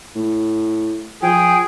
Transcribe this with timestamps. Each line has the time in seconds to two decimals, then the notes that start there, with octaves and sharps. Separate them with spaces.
0.15 A2
1.22 F3 G#4 G5